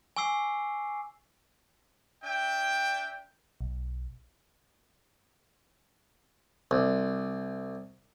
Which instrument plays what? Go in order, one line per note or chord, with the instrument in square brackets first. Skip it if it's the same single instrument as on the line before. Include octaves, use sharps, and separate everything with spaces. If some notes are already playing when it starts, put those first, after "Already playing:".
[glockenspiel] G#5 C#6 D6 E6 C7
[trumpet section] D4 E5 G5
[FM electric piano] B1
[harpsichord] C2